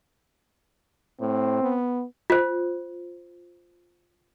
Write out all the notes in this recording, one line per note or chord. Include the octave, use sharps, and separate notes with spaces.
A2 C4
B3
F4 C5